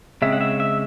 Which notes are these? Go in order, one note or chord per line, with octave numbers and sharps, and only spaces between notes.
C#3 G#3 C4 E5
F#5
E5
E5